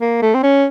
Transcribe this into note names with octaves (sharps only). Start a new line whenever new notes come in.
A#3
A3
C4
C#4